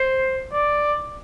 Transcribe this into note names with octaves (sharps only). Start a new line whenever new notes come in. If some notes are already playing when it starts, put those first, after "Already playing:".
Already playing: C5
D5